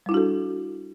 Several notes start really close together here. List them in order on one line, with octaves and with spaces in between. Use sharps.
G3 E4 D4 F#4 A4